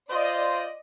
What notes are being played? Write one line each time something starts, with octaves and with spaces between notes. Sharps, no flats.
F4 C5 D5 D#5